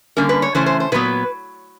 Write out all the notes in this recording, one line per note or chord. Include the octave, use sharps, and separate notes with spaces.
D3 G3 A#3 C#4 A#4
B4
C#5
C#3 E3 A3 C#4 C5
C5
C5
A#2 F#3 B3 B4